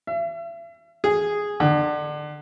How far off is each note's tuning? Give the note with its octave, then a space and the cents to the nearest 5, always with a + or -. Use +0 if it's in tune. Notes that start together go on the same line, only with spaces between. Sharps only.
E5 +40
G#4 -5
D3 +25